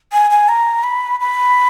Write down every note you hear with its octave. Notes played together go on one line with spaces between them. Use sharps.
G#5
G#5
A#5
B5
B5